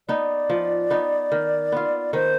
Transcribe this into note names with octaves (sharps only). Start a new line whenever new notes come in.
B3 D#4 D5
F3
B3 D#4
D#3
B3 F4
D#3 C5